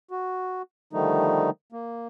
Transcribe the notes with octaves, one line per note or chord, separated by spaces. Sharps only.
F#4
D3 D#3 F3 G3 A3 D#4
A#3